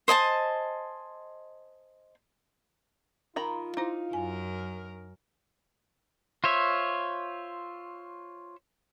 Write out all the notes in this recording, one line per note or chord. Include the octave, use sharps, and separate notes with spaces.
C5 D#5 G#5 A5
D#3 F4 A#5 B5
D#4 E4 C5
F#2 A#4 G#5
F4 C5 C#5 E5